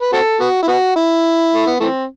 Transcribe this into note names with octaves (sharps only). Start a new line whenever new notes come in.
B4
C4 F#4 A4
B3 F#4
E4
B3 F#4
E4
A3
B3
E3 A3 C4